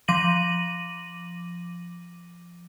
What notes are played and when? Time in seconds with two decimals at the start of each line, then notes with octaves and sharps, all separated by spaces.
0.08 F3 D6 A#6 D#7 F#7